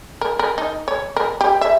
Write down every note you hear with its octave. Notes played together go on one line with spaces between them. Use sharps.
A#4
A#4
D#4
C#5
A#4
G4
E5